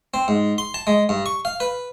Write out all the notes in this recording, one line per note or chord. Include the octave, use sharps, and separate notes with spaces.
C4
G#2
C6
A5
G#3
G2
C#6
F5
B4